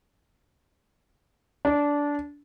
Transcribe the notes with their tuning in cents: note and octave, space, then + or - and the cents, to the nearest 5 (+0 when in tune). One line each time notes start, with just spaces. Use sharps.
D4 -15